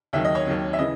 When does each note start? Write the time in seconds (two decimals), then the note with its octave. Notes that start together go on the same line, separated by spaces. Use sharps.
0.13 D#2 D#3 F#3 E5
0.25 D#5
0.35 C#5
0.47 D#2 D#3 F#3
0.73 E5
0.79 C#3 E3 D#5